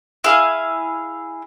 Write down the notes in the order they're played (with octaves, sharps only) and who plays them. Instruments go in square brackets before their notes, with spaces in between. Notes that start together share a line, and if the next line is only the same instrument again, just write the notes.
[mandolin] E4 G#4 F5